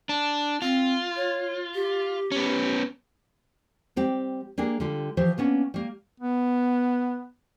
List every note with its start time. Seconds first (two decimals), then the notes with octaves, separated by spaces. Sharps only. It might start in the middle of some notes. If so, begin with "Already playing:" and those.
0.09 D4
0.62 C4 F4
1.16 C#5
1.75 G4
2.32 B3 C#4
3.96 G3 C4 G4
4.58 A#3 D4 G4 G#4 A#4
4.80 D3 G3 F4 G4
5.17 E3 F3 G4 C5
5.38 A#3 B3 C#4 D4
5.74 G3 A#3
6.20 B3